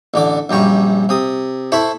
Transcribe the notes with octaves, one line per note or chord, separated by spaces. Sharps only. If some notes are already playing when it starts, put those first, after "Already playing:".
A1 D3 D6
A#1 F#2 G3 C#6
C3 D#6
E4 A4 C5 B5 C#6